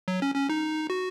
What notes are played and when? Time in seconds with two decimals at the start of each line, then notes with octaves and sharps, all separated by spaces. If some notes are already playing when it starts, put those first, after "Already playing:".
0.08 F#3
0.22 C#4
0.35 C#4
0.49 D#4
0.90 F#4